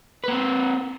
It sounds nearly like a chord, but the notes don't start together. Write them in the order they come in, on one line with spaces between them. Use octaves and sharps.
B4 A#3 C4